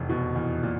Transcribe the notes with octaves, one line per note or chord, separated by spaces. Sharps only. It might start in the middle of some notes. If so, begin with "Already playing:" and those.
Already playing: F1 E2
B2
E2
A#2